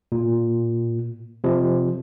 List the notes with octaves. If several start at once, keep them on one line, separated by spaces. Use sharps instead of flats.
A#2
C3 F3